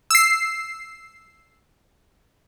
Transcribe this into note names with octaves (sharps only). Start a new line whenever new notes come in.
E6 C7